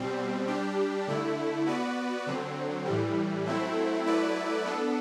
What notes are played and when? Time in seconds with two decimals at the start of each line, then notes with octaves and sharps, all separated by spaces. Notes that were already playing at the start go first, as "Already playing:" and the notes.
Already playing: B2 G3 C4
0.47 G3 D4 G4
1.08 D3 A3 E4
1.66 B3 F#4 B4 D5
2.27 D3 F#3 C4
2.86 A2 E3 G3
3.46 F#3 A3 C4 E4
4.06 F#3 A3 E4 B4 D5
4.65 B3 D4 A4